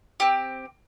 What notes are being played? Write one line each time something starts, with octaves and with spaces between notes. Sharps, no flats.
C4 G4